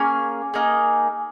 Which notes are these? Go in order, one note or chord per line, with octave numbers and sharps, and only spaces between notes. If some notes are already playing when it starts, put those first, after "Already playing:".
Already playing: A#3 C#4 G#4 G#5
A#3 D#4 G#4